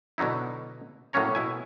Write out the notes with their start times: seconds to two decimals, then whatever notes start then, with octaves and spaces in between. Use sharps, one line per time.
0.18 B2 D3 F#3 D#4 E4
1.13 A2 F#3 A#3 C#4 C#5 A#5
1.35 B2 E4 G#5